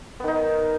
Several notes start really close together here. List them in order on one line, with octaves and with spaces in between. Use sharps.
B3 D#3 D#4